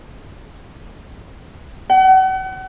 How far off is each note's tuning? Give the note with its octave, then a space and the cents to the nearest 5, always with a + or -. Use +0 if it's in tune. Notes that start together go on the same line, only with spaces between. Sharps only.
F#5 +40